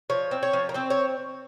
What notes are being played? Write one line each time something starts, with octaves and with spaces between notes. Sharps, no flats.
F3 C#5
C4
C#5
F3
A#4
C4 C5
C#5